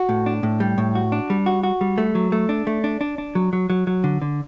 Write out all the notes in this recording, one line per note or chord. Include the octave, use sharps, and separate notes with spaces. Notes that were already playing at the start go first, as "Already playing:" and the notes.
Already playing: F#4
A2
D4
A2
G3
A2
F#4
D4
G3
F#4
F#4
G3
A3
F#3
A3
D4
A3
D4
D4
D4
F#3
F#3
F#3
F#3
D3
D3